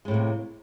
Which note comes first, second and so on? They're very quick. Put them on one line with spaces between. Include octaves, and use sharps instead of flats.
G#3 A2 A#3 C3